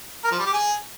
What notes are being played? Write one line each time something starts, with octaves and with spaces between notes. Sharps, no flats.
A#4
F3
G3
G4
G#4